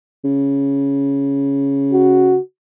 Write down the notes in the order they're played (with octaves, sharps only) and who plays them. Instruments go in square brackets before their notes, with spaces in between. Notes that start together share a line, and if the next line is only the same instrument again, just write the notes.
[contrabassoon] C#3
[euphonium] F#4